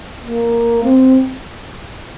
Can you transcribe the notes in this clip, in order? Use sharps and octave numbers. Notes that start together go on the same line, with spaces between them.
A#3
C4